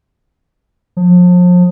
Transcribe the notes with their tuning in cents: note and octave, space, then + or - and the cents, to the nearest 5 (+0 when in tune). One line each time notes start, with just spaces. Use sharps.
F3 +35